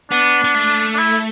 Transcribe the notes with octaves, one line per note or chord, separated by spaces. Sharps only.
B3 D4
B3
A3
D4
E4